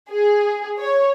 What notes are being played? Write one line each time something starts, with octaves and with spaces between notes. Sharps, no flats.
G#4
C#5